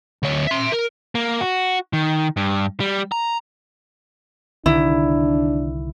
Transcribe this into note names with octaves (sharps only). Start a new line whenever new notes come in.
D2 C#5
E5 C6
A#4
A#3
F#4
D#3
G2
G3
A#5
C2 D3 D#3 D4 E4